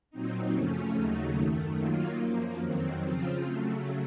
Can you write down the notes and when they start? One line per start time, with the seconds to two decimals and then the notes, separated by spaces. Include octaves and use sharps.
0.11 A#2 F#3 C4 D#4
0.52 F#2 C#3 F3 A3 C#4
0.94 D#2 C#3 F#3 A3 D#4
1.36 F#2 D#3 A3
1.78 D#3 F#3 A#3 F4
2.19 F#2 F3 A#3
2.61 F2 D#3 F#3 C4
3.03 C#3 F3 C4 F4
3.44 C#3 F#3 A3